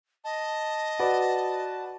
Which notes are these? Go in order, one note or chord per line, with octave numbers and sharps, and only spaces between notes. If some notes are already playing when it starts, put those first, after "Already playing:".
D#5 A5
F#4 B4 D5